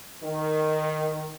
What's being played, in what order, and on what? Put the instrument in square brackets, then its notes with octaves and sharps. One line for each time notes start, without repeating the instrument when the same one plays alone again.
[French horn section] D#3